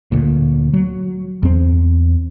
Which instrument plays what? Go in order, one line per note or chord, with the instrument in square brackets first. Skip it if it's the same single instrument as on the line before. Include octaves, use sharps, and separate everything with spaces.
[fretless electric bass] D2 A#2
F#3
E2 C4